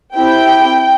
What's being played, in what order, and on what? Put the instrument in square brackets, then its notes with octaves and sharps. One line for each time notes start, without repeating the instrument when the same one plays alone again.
[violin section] C4 E4 G4 G5